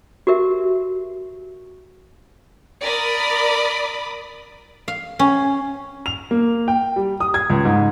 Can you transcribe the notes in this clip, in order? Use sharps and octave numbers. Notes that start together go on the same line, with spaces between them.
F#4 G4 A#4 E5
A#4 D5 B5 D#6
F5
C#4
F7
A#3
G5
G3
D#6
G#6
C#2
G#2